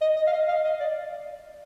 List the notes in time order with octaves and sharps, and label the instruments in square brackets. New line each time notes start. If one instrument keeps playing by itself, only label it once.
[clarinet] D#5
D#5
F5
D#5
F5
D#5
D5